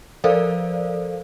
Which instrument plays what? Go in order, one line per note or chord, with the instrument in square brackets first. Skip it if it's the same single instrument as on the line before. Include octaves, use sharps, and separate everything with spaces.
[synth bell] F3 A4 A#4 C5 D5 F5